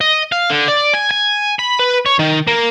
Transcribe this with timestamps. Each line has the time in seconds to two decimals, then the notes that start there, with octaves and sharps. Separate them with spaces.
0.01 D#5
0.32 F5
0.50 D3
0.68 D5
0.94 G#5
1.11 G#5
1.59 B5
1.79 B4
2.06 C#5
2.19 D#3
2.48 A#3